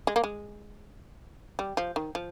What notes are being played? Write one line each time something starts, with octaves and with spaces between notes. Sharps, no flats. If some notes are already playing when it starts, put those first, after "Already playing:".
G#3
A#3
G#3
G3
F3
D#3
F3